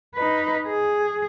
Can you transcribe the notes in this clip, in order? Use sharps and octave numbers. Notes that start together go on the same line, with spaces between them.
D#4 B4
G#4